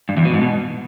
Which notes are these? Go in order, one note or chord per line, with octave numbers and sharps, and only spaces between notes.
G2
E2
B2
G#2
B2